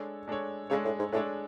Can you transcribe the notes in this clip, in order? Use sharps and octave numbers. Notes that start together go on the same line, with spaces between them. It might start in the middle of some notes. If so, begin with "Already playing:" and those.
Already playing: G#3 D4 A4 C#5
G#3 D4 A4 C#5
C#3 G#3 D4 A4 C#5
A2
G#2
A2 G#3 D4 A4 C#5